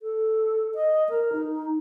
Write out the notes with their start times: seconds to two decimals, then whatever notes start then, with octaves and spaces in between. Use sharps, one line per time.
0.01 A4
0.75 D#5
1.09 A#4
1.33 D#4